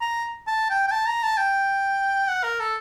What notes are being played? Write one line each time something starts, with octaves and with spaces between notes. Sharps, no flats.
A#5
A5
G5
G5
A5
A#5
A5
G5
F#5
A#4
A4